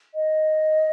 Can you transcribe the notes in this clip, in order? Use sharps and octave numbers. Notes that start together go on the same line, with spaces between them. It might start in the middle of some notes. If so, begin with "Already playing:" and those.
D#5